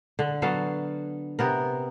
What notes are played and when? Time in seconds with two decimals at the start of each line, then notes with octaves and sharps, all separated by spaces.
0.19 D3
0.42 F#3 B3 A4 F5
1.39 C3 B3 A#4